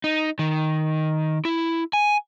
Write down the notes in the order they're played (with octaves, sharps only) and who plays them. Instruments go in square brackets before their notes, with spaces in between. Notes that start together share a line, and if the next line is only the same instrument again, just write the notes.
[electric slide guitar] D#4
D#3
E4
G#5